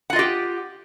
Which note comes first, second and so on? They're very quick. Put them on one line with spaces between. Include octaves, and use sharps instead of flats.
F#5 F4 D#5 G4